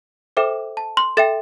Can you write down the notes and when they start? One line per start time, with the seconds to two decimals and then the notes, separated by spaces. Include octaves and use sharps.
0.37 A4 C5 E5 G5 D6
0.77 A5
0.97 C6
1.17 A4 E5 G5 A6